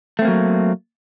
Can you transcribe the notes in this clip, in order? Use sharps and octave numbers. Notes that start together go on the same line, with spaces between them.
F#3 A3 A#3 C4